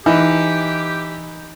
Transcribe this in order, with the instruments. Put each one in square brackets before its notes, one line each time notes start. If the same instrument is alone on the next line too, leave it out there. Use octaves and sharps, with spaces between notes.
[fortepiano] E3 [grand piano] D#4 [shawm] G4